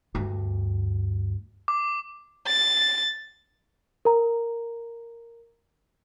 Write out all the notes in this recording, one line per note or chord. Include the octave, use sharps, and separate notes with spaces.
D2 G2
D6
A6
A#4 A#5